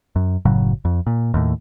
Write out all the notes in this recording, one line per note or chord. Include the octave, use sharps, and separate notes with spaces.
F#2
F#1 A2 C#3 F#3
F2
A#2
D#2 A2